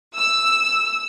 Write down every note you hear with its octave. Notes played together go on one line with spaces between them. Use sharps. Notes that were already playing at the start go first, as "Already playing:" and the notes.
E6